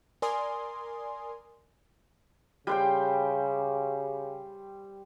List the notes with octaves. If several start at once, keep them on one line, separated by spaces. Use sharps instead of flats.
A#4 D5 G#5 C6 D#6
C#3 G3 C5 G5